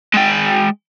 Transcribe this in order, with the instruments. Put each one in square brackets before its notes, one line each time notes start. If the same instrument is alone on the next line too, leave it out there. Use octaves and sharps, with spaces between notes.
[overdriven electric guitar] G#3 G5